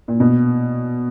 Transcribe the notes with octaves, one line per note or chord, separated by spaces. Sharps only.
A#2
B2